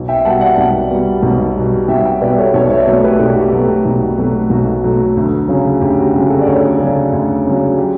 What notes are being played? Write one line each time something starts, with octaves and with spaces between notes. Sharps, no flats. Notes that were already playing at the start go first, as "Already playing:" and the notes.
Already playing: B1
E5 G5
B2 G3 F#5 A5
D5 F#5
B1
B2 G3
B1
B2 G3
B1 E5 G5
E5 G5
B2 G3 B4 D5
A4 C#5
B1 A4 C#5
C#5 E5
D5
B2 F#3 A3 A4 C#5
G4 B4
B1 A4
G4
F#4
G4
B2 F#3 A3
B1
B2 F#3 A3
B1 F#4
B2 F#3 A3
D2
C#3 F#3
D2 G4
F#4
C#3 F#3 G4
F#4 A4
D5
D2 A4 C#5
C#3 F#3
D2
C#3 F#3
G4